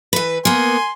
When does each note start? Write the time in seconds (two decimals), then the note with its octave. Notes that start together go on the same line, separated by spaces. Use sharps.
0.13 E3 B4
0.45 A#3 B3 G#5 C6